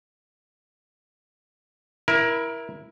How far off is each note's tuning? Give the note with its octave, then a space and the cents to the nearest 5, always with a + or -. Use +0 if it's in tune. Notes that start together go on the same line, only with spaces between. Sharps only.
E4 +0 A#4 +20